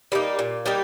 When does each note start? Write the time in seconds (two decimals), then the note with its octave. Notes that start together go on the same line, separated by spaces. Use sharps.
0.12 G3 A#3 D#4
0.39 A#2
0.66 G3 A#3 D#4